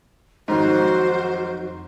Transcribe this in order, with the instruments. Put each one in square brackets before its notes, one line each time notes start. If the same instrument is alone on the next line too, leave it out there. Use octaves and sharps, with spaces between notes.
[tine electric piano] F2 F#3 D#4 [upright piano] G#2 D#3 [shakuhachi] F#4 [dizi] C5